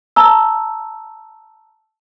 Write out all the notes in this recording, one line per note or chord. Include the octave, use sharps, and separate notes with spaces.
A5 A#5 E6